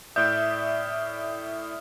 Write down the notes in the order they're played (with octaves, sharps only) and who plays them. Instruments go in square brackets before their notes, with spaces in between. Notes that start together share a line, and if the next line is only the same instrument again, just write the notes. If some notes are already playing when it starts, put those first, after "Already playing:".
[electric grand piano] A2 D5 E5 [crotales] D#6 F6 D7 [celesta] G6